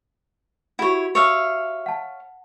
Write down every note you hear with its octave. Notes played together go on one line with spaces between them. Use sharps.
E4 F#4 G4 C#5 F#5
C#5 E5 F5
F#5 A5